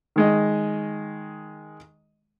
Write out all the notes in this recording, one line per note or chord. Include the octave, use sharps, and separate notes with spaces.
D#3 G#3 D#5